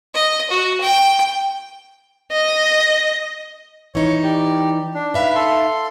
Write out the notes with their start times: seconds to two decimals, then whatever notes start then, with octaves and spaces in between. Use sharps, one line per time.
0.14 D#5
0.50 F#4
0.81 G5
2.32 D#5
3.95 E3 D#4 C#5
4.23 G4 D5
4.94 D4
5.14 D#4 B4 E5 F5
5.35 A4 C6